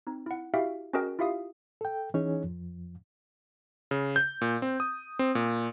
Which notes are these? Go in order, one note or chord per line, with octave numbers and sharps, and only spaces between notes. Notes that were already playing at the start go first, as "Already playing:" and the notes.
C4 D#4
E4 F#5
E4 F#4 G4 E5 F5 G5
C#4 F#4 G#4 A#4 D#5 G5
E4 F4 G4 E5 F5 D#6
A4 G5
E3 C#4 D#4 G#4 C#5
F2 F3
C#3
G6
A#2
C4
D#6
C4
A#2